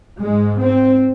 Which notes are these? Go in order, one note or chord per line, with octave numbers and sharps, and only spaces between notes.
G#2 G#3
C4